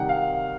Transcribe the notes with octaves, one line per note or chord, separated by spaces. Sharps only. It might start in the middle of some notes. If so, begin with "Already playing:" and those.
Already playing: C3 D#3 G3 F#5 G5
F5